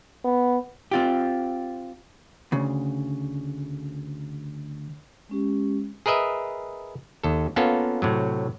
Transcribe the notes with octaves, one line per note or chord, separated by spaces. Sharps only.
B3
C4 F4 G4
D2 C#3
G#3 C#4 G4
G#4 A#4 B4 D#5 E5
D#2 A4
A#3 B3 C#4 F4 A4
A2 C3 F#3